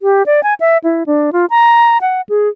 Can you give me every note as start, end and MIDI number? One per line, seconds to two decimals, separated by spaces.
0.02 0.23 67
0.26 0.43 74
0.43 0.54 80
0.60 0.78 76
0.84 1.04 64
1.06 1.30 62
1.33 1.46 65
1.50 1.98 82
2.01 2.21 78
2.29 2.49 68